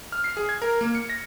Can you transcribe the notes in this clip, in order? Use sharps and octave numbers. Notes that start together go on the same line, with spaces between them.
F6
C7
G#4
G#6
A#4
A#3
C#7
A#6